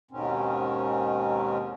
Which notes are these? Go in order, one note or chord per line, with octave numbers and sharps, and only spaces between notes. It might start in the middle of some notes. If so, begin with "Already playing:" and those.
D#2 G#2 B2 D#3 C4 C#4